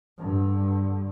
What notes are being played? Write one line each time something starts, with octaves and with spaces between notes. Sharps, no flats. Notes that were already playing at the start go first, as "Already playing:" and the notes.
G2 D3